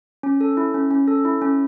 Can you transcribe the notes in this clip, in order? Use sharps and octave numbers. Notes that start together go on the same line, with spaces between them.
C#4
A4
E4
C#4
C#4
A4
E4
C#4